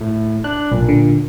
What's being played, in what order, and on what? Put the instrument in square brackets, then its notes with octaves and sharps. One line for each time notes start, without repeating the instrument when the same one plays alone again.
[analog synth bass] A2
[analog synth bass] D4 [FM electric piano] F#6
[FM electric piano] B1 [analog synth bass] A#2
[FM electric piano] D3